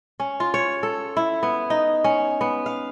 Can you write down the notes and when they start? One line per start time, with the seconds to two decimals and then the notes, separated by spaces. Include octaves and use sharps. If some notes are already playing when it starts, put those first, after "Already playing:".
0.20 C#4
0.40 F4
0.54 C#5
0.83 A4
1.17 E4
1.43 B3
1.70 D#4
2.04 C#4
2.41 B3
2.66 F5